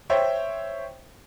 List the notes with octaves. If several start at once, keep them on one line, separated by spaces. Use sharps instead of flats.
C5 C#5 E5 G5